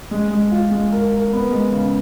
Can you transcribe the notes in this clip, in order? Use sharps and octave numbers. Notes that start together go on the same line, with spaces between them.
G#3
G#3
F4
G#3
A#4
A#4
B3
G#3
C#3